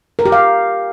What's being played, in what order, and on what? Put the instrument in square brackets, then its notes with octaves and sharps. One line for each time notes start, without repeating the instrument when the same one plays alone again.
[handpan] A#4
G4
F5